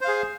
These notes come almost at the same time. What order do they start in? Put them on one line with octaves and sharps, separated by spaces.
C5 F5 G#4